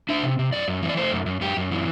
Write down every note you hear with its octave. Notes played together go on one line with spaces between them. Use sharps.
D4 E5
C3
C3
F#2 D5
F#2
E3
D5
A3 C5
F#2
F#2
F#2 G4
F#2
E3